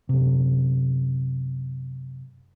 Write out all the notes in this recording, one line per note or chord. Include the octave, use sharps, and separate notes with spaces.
F#2 C3